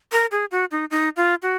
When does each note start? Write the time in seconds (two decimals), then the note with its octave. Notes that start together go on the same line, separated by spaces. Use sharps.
0.12 A#4
0.31 G#4
0.51 F#4
0.71 D#4
0.91 D#4
1.17 F4
1.42 F#4